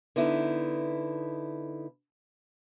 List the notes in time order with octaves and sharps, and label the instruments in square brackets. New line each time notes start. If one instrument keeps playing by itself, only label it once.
[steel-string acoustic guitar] D3 B3 D#4 E4